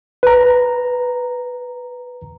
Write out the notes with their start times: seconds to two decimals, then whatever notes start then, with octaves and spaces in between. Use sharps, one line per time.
0.23 B4 A#5